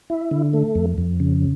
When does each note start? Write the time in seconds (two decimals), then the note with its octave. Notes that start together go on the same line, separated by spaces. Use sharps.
0.10 E4
0.31 D3
0.53 A3
0.75 F2
0.98 F2
1.20 C#3